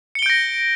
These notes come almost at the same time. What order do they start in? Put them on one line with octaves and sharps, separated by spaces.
C#7 G7 D7 G6 A#6